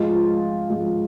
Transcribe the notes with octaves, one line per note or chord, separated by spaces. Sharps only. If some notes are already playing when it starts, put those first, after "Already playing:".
Already playing: F3 G#3 F4
F3 G#3 F4